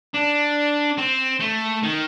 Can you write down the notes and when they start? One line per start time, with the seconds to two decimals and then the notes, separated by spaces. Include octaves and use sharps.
0.14 D4
0.98 C4
1.40 A3
1.83 D#3